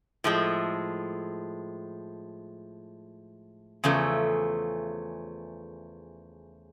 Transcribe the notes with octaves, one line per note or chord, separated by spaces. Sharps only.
A2 F3 G#3
E2 C#3 F3 A3